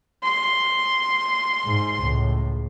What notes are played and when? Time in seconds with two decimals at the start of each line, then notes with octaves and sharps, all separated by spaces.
0.23 C6
1.65 G#2
2.00 C#2 A2